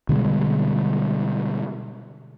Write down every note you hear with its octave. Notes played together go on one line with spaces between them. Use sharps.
B2 D3 G3 G#3